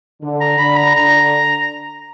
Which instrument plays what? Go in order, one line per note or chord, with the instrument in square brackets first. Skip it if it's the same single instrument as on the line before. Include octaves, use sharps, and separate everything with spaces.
[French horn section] D3
[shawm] A#5
[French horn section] D3 [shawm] B5
[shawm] A#5
[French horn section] D3 [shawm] A#5